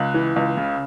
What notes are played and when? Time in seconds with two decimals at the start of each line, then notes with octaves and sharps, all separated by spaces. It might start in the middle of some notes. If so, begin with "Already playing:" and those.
Already playing: C#2 F#6
0.14 E3
0.36 C#2
0.57 C#3